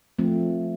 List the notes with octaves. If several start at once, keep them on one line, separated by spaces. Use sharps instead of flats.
F3 A3 C4